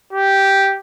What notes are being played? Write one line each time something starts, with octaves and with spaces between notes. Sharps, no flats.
G4